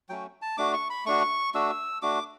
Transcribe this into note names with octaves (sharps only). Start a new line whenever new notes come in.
F#3 A3 C#4 F#4 G5
A5
A3 D4 F#4 D6
C#6
B5
A3 D4 F#4 C#6
A3 D4 F#4 E6
A3 D4 F#4 D6